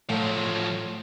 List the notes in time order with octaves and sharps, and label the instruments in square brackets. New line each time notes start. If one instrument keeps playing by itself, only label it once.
[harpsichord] A2 [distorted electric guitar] F3 F#3